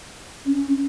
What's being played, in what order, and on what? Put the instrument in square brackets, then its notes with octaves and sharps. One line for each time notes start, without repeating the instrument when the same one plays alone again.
[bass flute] C#4